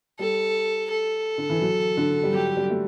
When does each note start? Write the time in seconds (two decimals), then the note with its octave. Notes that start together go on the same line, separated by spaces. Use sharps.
0.19 G3 A4
0.91 A4
1.38 D3
1.50 E3
1.61 F#3
1.97 D3
2.23 G3
2.32 F#3 G4
2.57 G3
2.70 A3